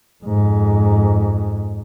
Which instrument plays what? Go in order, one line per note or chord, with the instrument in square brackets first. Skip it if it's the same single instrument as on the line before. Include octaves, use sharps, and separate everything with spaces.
[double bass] F2 G#2